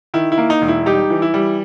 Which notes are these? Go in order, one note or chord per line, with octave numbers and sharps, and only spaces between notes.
D#3 E4
E4
A#3
D#4
E1
E4
G3 D#4 G4
E3
E4
G3